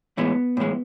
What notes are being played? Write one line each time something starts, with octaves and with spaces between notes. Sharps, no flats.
A2 E3 G#3 B3
A2 E3 G#3